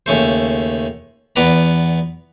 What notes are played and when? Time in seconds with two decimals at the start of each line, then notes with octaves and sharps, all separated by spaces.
0.06 D#2 C#3 A3 C5
1.36 E2 B3 B4 D5 A#5